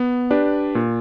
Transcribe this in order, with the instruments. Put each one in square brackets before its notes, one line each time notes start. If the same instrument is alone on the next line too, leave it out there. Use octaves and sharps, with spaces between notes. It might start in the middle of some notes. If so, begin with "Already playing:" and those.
Already playing: [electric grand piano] B3
D4 G4 B4 D5
A#2